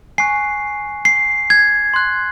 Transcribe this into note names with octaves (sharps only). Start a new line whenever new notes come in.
G#5 C#6 F#6 C7
C7
G#6
C6 F#6